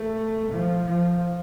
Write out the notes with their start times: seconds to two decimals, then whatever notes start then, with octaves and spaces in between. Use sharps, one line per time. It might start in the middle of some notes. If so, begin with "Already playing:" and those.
Already playing: A3
0.50 F3
0.86 F3